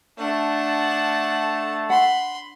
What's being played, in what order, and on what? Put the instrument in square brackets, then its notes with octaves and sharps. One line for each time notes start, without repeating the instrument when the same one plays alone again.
[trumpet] A3 [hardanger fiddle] D4 F#5 [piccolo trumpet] A5
[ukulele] F#5 [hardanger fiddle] B5 C6